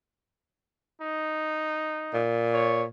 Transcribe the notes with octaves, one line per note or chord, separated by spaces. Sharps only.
D#4
A#2
C#5